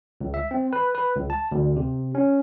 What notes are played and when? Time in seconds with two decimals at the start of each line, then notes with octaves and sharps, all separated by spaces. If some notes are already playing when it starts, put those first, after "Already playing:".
0.21 C#2
0.34 E5
0.51 C4
0.73 B4
0.95 B4
1.15 C#2
1.30 A5
1.52 D2
1.76 C3
2.15 C#4